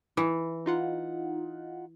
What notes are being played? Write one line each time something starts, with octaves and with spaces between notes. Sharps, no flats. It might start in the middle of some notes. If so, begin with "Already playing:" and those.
E3
D#4 F4 F#5